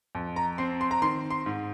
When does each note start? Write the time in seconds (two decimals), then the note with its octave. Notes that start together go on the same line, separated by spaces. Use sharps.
0.15 F2
0.36 A#5
0.58 C4 C6
0.81 C6
0.91 A#5
1.02 D#3 C6
1.30 C6
1.46 G#2